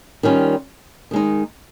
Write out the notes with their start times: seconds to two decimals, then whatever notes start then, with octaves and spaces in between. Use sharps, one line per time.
0.23 D#3 G3 C#4 F4
1.11 D#3 G#3 D#4